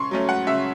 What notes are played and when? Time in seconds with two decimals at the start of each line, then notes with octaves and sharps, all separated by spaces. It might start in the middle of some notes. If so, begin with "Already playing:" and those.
Already playing: C#3 C6 C#6
0.11 F#3 A3 C#4
0.29 F#5
0.47 C#3 E5